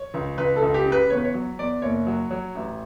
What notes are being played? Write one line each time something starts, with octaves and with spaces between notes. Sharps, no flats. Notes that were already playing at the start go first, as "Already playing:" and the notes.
Already playing: C#5
C#2
C#2 B4
A4
C#2
G4
C#3
B4
E2 C#5
B4
C#5
F#3
E2 D5
F#1 C#5
F#3
F#3
A1